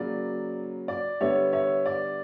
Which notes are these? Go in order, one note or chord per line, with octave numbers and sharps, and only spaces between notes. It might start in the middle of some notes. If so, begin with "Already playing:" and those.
Already playing: C#3 F#3 A#3 D5
D5
D3 G3 B3 C#5 E5
C#5 E5
D5